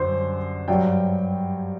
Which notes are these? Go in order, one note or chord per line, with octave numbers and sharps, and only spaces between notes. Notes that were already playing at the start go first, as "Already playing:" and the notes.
Already playing: F#2 D3 G3 C5
G2 F#3 G5